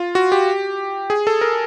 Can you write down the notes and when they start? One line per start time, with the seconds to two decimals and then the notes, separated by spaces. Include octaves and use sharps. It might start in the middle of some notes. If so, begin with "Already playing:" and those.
Already playing: F4
0.15 F#4
0.32 G4
1.10 G#4
1.27 A4
1.41 A#4